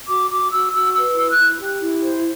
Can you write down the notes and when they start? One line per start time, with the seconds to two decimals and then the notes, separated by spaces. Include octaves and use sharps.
0.08 F#4 D6
0.30 F#4 D6
0.52 F#4 E6
0.73 F#4 E6
0.95 B4 E6
1.16 E4 E6
1.31 F#6
1.38 E4
1.60 G4
1.81 E4
2.02 C5